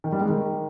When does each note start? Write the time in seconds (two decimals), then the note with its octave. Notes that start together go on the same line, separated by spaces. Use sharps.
0.04 D#3
0.12 G3
0.21 G#3
0.29 D#3